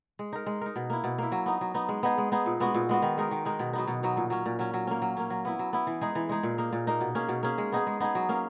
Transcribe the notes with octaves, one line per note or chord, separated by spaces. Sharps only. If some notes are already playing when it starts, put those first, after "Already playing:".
G#3
D#4 A#4
G#3
D#4 A#4
B2
A#3 E4
B2
A#3 E4
F#3
B3 D#4
F#3
B3 D#4
G#3
B3 D#4 G#4
G#3
B3 D#4 G#4
A#2
G#3 B3 F#4
A#2
G#3 B3 F#4
D#3
G#3 D#4 A#4
D#3
G#3 D#4 A#4
B2
F#3 B3 D#4
B2
F#3 B3 D#4
A#2
F#3 C#4
A#2
F#3 C#4
F#3
A#3 C#4
F#3
A#3 C#4
F#3
B3 E4
F#3
B3 E4
E3
G#3 D#4 G#4
E3
G#3 D#4 G#4
A#2
A#3 D#4
A#2
A#3 D#4
B2
A#3 C#4 G#4
B2
A#3 C#4 G#4
G#3
B3 D#4 G#4
G#3
B3 D#4 G#4
F#3
A#3 C#4